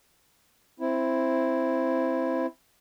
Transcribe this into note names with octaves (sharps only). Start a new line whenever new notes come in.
C4 E4